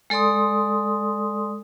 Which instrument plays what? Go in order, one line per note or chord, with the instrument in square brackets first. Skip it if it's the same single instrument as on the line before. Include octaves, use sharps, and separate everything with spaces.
[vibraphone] G#3 A4 D5 C6 D#6